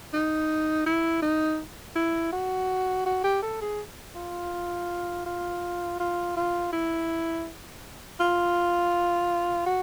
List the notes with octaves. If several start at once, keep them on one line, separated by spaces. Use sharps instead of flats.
D#4
E4
D#4
E4
F#4
F#4
G4
A4
G#4
F4
F4
F4
F4
E4
F4
F#4